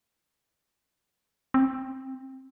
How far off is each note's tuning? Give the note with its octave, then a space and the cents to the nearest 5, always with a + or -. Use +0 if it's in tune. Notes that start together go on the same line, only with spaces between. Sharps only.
C4 +15